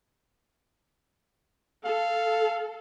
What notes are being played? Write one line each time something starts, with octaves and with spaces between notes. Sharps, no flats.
A4 F5